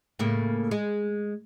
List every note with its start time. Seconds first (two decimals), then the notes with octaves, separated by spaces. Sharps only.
0.19 A2 C#3 A#3
0.71 G#3